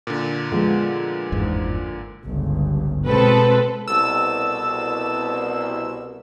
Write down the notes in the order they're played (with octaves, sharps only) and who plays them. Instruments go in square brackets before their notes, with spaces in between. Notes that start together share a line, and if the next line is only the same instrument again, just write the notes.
[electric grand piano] A#2 D3
[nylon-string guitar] F3 G#3 B3
[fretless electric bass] G1 E2 G#2
[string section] G1 C#2
B2 G#3 C4 A4 B4
[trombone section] C2 B2 [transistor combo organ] A4 [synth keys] E6